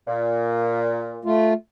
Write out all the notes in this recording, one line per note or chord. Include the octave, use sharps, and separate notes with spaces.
A#2
A3 F4